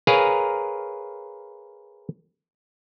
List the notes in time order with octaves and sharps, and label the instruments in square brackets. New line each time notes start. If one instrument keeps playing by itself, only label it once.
[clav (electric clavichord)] G#4 A#4 B4 C#5 F5 A#5